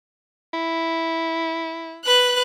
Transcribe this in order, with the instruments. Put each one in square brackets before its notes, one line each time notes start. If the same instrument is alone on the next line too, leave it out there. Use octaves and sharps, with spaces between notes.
[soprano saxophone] E4
[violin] B4 F#6